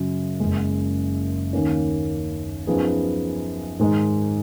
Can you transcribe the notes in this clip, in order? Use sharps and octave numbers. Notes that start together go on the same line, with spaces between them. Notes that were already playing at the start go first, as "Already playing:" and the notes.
Already playing: F#2 C#3 F#3
F#1 F#2 C#3 G#3
D#2 D#3 A#3 C#4
F#2 F3 B3 D#4 G#4
G#2 D#3 G#3 D#4